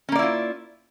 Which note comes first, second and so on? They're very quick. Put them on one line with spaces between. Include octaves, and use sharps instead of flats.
C#4 A#3 D5 E4 F4